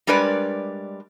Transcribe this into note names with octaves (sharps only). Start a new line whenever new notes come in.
G3 G#3 D4 A#4 B4 D5